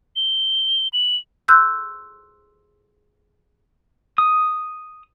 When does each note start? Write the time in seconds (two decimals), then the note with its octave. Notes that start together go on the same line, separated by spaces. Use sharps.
0.16 G7
0.93 F#7
1.48 C6 E6 F#6 G6
4.18 D#6